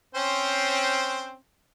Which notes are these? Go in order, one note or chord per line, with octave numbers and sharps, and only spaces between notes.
C4 C#4 C5